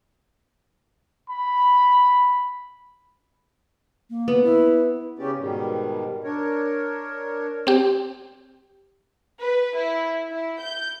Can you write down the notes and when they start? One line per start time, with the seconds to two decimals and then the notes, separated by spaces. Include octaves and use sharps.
1.30 B5
4.10 A#3
4.28 B3
4.43 E4
5.19 C#3 C#4 G4 D5
5.38 G#2 B2 D#3 G3
6.24 D4 A#4 C#5
7.67 C4 G4
9.42 B4
9.78 E4
10.29 E4
10.61 G6